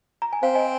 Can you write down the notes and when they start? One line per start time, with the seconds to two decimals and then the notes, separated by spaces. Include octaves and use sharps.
0.22 A#5
0.33 G#5
0.43 C4 C5 F5
0.55 D#5 G#5